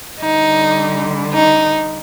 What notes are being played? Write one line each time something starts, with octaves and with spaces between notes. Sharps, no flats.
D3 G3 D#4
D#4